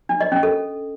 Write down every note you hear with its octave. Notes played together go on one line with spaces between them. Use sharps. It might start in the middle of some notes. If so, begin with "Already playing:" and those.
D4
D#5
C#4
A4